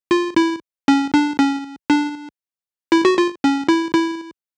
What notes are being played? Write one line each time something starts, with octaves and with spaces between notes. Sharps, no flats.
F4
E4
C#4
D4
C#4
D4
E4
F#4
F4
C#4
E4
E4